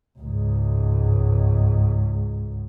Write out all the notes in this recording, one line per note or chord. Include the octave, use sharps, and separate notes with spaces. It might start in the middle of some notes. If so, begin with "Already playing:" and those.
C#2 G#2